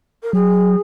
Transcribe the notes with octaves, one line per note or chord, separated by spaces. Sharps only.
A#4
F#3 G#4